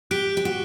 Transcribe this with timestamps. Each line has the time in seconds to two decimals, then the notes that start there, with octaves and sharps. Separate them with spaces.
0.11 G4 F#6 B6 D7 G7
0.37 G4
0.45 F#4